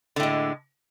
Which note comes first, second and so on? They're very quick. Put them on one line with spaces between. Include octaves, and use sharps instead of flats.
D3 A2 G#3